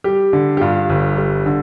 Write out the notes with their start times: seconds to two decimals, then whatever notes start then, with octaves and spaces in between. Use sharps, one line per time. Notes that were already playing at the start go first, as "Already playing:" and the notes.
0.04 G3 G4
0.33 D3
0.57 G4
0.61 G2 F4
0.90 G1
1.18 G3
1.46 D3